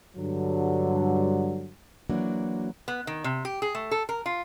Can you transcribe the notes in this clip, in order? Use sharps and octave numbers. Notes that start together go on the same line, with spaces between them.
G2 D3 F#3
E3 F#3 A#3 D4 F#4
B3
D#3
C3
G4
G#4
A3
A4
A#4
F4